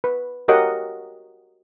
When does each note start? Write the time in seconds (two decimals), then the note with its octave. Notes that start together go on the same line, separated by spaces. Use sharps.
0.04 B4
0.48 F#4 G4 A#4 C#5 D#5 F#5